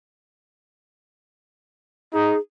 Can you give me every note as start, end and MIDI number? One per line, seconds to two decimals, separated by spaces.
2.13 2.36 63
2.13 2.39 68